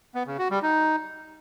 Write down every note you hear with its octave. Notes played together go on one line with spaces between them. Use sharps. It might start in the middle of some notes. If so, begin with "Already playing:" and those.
B3
C#3
F#4
G3
D#4